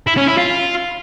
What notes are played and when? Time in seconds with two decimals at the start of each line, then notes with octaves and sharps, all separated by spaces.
0.07 E4
0.17 C#4
0.27 E4
0.37 F4